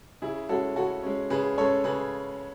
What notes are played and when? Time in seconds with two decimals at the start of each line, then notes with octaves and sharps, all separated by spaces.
0.22 C#3 E4 G#4
0.49 G#3 C#4 F#4 A4
0.76 C#3 F#4 A4
1.03 G#3 C#4
1.30 C#3 G#4 B4
1.58 G#3 C#4 A4 C#5
1.84 C#3 G#4 B4